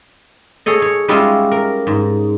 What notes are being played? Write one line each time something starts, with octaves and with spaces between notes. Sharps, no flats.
G#4 A4 C#5 D#5
C#5
G3 G#3 C#4 F4 D#5 E5
A#4
G#2